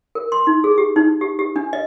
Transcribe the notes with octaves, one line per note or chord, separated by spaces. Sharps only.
A#4
C6
D#4
G#4
G4
D#4
G4
G4
D4
D#5